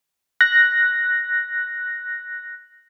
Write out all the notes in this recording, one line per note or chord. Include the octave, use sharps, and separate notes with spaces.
F#6 A#6